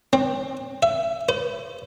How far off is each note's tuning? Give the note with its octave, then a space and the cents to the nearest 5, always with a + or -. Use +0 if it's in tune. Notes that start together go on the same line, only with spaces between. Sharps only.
C4 +20
E5 +25
C5 -40